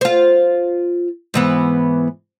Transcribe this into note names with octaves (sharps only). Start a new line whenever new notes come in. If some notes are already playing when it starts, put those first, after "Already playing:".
F4 C5
G#2 E3 B3